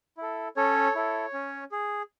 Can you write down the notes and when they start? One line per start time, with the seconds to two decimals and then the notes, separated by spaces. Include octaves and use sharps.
0.17 E4 A4
0.56 C#4 A4 C#5
0.95 E4 A4
1.33 C#4
1.72 G#4